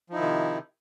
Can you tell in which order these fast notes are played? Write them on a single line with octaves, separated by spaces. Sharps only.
F3 D#4 E4 D#3 C3